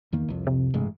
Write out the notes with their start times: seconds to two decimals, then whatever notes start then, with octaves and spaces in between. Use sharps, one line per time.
0.13 E2 D#3 A#3
0.28 C2 F2
0.47 C3
0.74 A1 G2 G#3